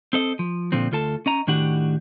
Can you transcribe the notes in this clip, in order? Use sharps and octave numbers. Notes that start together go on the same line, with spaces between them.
C4 A4 D#5
F3
A#2 D3 F3 C4
D2 F4 A4 A5
C#4 D#5 A#5
A2 D#3 D4 F#4 G4 F#5